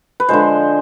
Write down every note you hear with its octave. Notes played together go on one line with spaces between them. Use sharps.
B4
D3 F3 G#3 C5